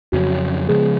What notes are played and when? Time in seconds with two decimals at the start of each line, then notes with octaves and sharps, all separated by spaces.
0.12 F2 C#3 F#3 C#4 F#4
0.69 C#3 F3 G#3 B3 G#4